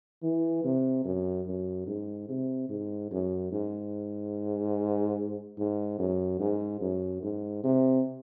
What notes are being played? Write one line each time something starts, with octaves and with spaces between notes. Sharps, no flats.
E3
C3
F#2
F#2
G#2
C3
G#2
F#2
G#2
G#2
F#2
G#2
F#2
G#2
C3